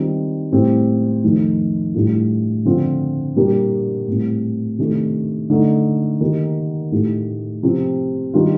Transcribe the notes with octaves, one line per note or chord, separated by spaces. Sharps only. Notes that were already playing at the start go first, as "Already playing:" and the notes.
Already playing: D#3 G3 C4 F4
A2 G3 C4 G4
F2 D#3 A3 D#4
A2 G3 D4 F4
D3 F3 C4 F4
A#2 G3 A#3 D4 G4
A2 G3 C4
C3 D#3 A3 D4
D3 A3 D#4
D#3 A#3 D#4 G4
A2 A3 D#4 G4
C3 F3 C4 G4
D#3 G3 D4 F4